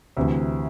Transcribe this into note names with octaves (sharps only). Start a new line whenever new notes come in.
D2 C3 E3